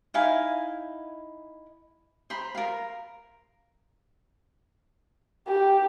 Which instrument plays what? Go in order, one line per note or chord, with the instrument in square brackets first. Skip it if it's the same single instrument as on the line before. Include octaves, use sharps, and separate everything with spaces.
[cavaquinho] D#4 E4 F5 G#5
C5 A#5 B5
A#4 F5
[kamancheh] G4